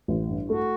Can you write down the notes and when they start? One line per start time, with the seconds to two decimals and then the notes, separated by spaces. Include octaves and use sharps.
0.08 A1
0.28 G2
0.50 A3 F#4